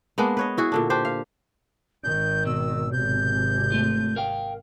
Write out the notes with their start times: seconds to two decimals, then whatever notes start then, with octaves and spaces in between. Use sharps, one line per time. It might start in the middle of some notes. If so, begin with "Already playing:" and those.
0.18 G#3 A#3 B3 D4
0.37 B4 C#5 D#5
0.57 E4 F#4 G#4
0.72 A#2 D3 D4
0.90 D4 G4 C5
1.05 F5
2.03 G#1 D#3 G6
2.45 B2 E6
2.92 G#1 C3 G6
3.72 A3 F4
4.16 A#4 F5 G5